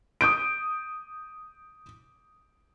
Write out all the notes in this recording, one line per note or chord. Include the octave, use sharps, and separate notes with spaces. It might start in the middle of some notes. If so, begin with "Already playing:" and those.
D#6 G6 D7